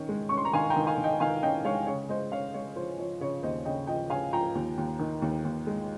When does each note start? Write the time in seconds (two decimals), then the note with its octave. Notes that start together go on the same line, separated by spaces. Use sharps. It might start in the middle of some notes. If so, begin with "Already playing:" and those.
Already playing: D#3 C#4
0.09 G#3
0.29 C#4 C#6
0.37 C6
0.45 A#5
0.53 D#3 F5 G#5
0.70 G5 A#5
0.76 D#3
0.87 F5 G#5
0.98 D#3
1.04 D#5 G5
1.20 D#3 F5 G#5
1.43 C#4 D#5 G5
1.65 G#3 C#5 F5
1.87 C#3 C#5
2.09 G#3 C5 D#5
2.32 C#3 C#5 F5
2.54 G#3 C#5
2.76 F3 C5
2.98 F3 C#5
3.21 C#3 C#5
3.43 D#2 C5 D#5
3.65 C#3 D#5 G5
3.87 F3 D#5 G5
4.10 C#3 F5 G#5
4.33 F3 G5 A#5
4.55 D#2
4.78 D#2
4.99 D#3
5.22 D#2
5.45 D#2
5.67 G#3